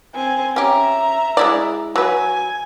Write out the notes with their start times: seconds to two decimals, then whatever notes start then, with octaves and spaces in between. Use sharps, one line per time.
0.15 C4 G#5
0.56 C#4 G4 E5 A#5
1.37 G#3 E4 D5
1.96 F#3 B4 G#5